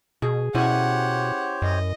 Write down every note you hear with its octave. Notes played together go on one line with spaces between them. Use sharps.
B2 G#4
B2 C#4 E4 G4 C5 C#5 F#5 G#5
F#2 D#5